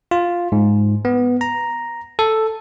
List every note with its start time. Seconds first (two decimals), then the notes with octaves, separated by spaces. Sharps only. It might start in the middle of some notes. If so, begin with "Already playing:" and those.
0.11 F4
0.52 G#2
1.05 B3
1.41 A#5
2.19 A4